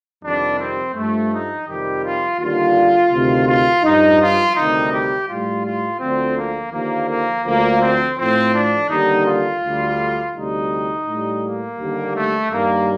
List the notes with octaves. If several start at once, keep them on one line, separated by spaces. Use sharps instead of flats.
F2 C3 D#3 G3 D4
C4
G2 F3 A3
D#4
F2 C3 D#3 G3 G4
F4
D#2 D3 G3 F4
D2 C3 D#3
F4
G2 F3 D#4
F4
D2 C3 D#3 G3 D#4
G4
A2 G3 F4
F4
D2 D3 F3 C4
A#3
D#2 D3 F3 A#3
A#3
D2 D3 F3 A#3
C4
A2 F3 C4
D4
D#2 D3 G3 D#4
F4
D2 D3 G3
D2 C3 G3 D#4
A2 G3
A#3
D#2 D3 G3
A3
G2 D#3 G3 A#3